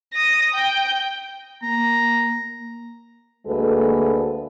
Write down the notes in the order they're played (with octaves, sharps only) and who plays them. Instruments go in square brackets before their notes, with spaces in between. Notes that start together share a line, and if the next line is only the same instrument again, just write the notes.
[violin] D#6 A#6
G5
[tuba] A#3 [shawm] A#5
[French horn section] D2 G#3 A#3 F#4 A4 B4